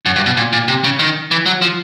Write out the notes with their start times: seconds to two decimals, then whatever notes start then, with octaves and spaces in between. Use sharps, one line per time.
0.06 F#2
0.16 G2
0.26 B2
0.37 A#2
0.53 A#2
0.68 C3
0.84 C#3
0.99 D#3
1.31 E3
1.46 F#3
1.62 F3